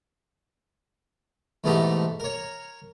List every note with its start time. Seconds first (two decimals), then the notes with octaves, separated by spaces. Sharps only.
1.64 G#2 B2 E3 A3 D#4 G4
2.20 A#4 C#5